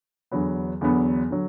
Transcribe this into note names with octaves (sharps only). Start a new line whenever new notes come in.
E2 D3 F#3 B3
E2 D3 F#3 B3
D3 F#3